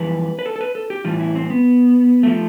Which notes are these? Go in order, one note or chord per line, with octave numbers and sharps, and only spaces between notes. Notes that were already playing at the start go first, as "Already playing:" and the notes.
Already playing: F2 E3 G3 B4
B4
A4
A4
B4
A4
G4
A2 E3 G3 F4
E4
C4
B3
F3 A3